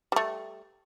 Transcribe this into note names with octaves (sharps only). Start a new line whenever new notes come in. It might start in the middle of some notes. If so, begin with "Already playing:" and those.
G3 A3